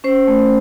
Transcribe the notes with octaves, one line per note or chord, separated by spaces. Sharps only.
C#4 C5
A3